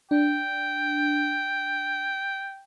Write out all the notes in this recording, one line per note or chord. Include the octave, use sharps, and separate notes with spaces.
D4 G5